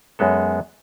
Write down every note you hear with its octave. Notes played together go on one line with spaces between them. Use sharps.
F#2 G#3 B3 A4